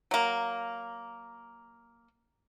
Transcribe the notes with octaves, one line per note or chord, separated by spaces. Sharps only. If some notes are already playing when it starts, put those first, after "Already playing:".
F#3 A#3